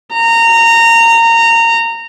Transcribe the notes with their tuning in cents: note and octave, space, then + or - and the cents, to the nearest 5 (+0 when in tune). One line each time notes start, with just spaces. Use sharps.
A#5 -20